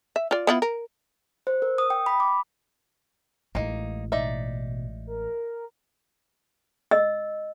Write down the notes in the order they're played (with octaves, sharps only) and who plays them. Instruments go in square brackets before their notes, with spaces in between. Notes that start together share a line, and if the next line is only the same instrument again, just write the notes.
[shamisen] E5
F4 D5
B3 E4 F4
A#4
[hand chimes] C5
A#4
D#6
G5
B5
D6
[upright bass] A1 G#3 [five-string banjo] A#3 D#4
[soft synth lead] B2 [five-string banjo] D#4 D5 E5
[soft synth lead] A#4
[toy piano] D#5 E6